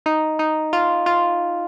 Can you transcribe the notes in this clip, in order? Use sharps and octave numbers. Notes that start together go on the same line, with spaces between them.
D#4
D#4
F4
F4